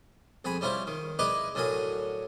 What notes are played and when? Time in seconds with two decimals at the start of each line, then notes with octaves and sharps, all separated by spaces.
0.45 F2 G#4 G#5 B5
0.61 G3 C#4 E4 F4 C5
0.87 D#3
1.19 E4 G#4 A#4 B4 D5 D#5
1.55 A2 D3 F#3 A#4 G#5 D#6